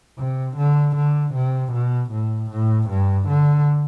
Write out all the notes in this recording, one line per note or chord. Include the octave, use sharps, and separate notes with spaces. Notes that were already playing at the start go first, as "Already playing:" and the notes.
C3
D3
D3
C3
B2
A2
A2
G2
D3